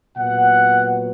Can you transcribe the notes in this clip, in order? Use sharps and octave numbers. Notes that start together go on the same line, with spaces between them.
A#2 F#3 B3 F#5